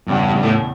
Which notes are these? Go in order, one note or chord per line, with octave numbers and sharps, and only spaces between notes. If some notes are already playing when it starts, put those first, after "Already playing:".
E2 G2 C#3 E3 G3
G2
A2